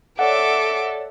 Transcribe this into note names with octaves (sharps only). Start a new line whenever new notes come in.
A4 C#5 D5 E5 F#5 D6